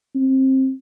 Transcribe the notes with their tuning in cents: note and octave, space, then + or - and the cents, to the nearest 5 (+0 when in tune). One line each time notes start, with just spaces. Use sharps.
C4 +20